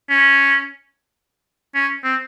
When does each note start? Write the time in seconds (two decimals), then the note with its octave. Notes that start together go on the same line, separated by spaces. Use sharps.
0.10 C#4
1.75 C#4
2.04 C4